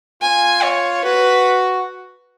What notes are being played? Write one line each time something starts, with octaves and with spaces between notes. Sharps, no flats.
F4 G#5
C#5
F#4 B4